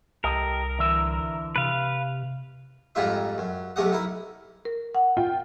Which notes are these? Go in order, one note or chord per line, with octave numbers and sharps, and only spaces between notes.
C2 G4 A4 A#4 D#5
D3 E3 E5
C3 B4 F5
F2 G#2 G3 D#4 F4 E5
F#2
B1 C3 A3 G4 D#5 F#5
D#4 E4 A#4
A#4
F#5
F4 G5